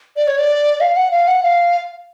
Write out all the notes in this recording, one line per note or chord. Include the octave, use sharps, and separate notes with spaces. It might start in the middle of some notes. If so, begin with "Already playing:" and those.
D5
C#5
D5
F5
F#5
F5
F#5
F5